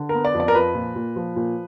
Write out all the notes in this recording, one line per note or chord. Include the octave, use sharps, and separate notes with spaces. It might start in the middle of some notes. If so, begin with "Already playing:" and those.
Already playing: D3
A#4
B3
D5
F2
D5
A#4
F3 B4
A#2
A#2
F3
A#2